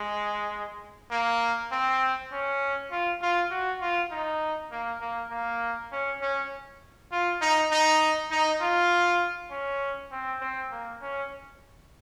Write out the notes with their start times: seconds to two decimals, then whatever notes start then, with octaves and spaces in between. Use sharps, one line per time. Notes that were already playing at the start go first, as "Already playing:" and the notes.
Already playing: G#3
1.11 A#3
1.72 C4
2.32 C#4
2.91 F4
3.22 F4
3.51 F#4
3.81 F4
4.12 D#4
4.72 A#3
5.01 A#3
5.31 A#3
5.92 C#4
6.22 C#4
7.12 F4
7.41 D#4
7.71 D#4
8.31 D#4
8.61 F4
9.51 C#4
10.12 C4
10.41 C4
10.71 A#3
11.02 C#4